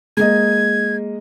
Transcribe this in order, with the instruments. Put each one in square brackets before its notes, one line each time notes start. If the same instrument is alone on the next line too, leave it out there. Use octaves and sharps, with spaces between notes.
[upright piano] G#3 A#3 D#5 [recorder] G#6